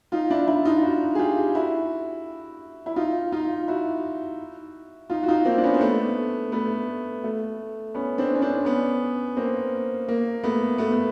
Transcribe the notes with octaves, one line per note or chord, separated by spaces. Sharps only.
D#4 F4
D4 E4
D4 E4
D#4 F4
E4 F#4
G#4
F4 G4
E4 F#4
E4
D#4 F4
D#4 F4
E4 F#4
D#4 F4
F#4
D#4 F4
A#3 C4
D4
B3 C#4
C4
A3 B3
A3 B3
A3
B3 C#4
C4 D4
C#4
C4 D4
B3 C#4
A#3 C4
A#3
A3 B3
A3 B3
B3